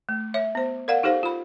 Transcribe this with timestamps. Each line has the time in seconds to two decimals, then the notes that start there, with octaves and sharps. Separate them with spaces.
0.09 A3
0.34 C#5 E5
0.55 B3 C5
0.88 A#4 D5 F5 F#5
1.03 D#4 G4 A4 C5 F5
1.23 F4 B5